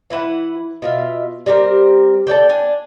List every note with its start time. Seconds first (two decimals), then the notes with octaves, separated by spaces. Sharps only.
0.10 E3 E4 B4 F#5
0.82 B2 F4 E5
1.46 G3 C4 G4 A#4
2.27 A4 C#5 D5 G5
2.49 D4 G#5